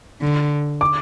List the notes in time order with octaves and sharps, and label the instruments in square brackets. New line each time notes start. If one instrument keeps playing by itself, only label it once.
[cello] D3
[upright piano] D6